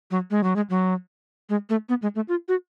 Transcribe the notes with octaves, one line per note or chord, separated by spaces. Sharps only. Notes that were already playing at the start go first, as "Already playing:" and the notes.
F#3
G#3
F#3
G#3
F#3
G#3
A3
B3
G#3
A3
F4
F#4